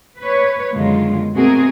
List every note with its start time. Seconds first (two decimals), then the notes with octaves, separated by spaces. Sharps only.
0.19 B4 C#5
0.73 F#2 B2 D3 D#3 G#3 F4
1.34 B2 A3 C4 F#4 G#4 A#4